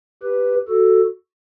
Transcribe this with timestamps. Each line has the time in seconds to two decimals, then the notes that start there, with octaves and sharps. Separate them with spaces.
0.23 G4 B4
0.68 F#4 A4